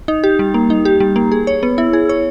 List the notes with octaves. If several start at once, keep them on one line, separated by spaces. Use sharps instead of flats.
D#4
G4
G3
A#3
D#4
G4
G3
A#3
G#4
C#5
B3
E4
G#4
C#5